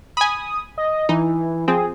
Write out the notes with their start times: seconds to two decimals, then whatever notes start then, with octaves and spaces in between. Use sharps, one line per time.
0.17 G#5 B5 D#6
0.78 D#5
1.09 E3 D#4
1.68 F3 C4 G#4